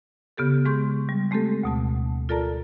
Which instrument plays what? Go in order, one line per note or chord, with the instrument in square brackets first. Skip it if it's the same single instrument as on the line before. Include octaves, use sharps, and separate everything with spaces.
[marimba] C#3 B3 G4 A4
G#3 G#4 C6 C#6 G6
G3
G#3 A3 C4 G4 A4
D2 B2 A5
F4 A4 A#4 D5 A5 A#5